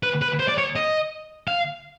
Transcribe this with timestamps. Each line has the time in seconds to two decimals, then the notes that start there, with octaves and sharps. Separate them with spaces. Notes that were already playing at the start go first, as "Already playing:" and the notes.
0.03 B4
0.22 B4
0.39 C5
0.48 D5
0.58 C#5
0.76 D#5
1.48 F5